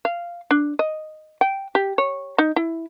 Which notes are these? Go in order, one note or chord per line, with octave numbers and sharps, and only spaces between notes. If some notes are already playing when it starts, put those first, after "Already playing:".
F5
D4
D#5
G5
G4
C#5
D#4
E4